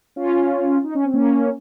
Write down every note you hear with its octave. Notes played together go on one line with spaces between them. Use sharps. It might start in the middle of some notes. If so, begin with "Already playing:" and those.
C#4 F4
D#4
C#4
C4
A#3 C#4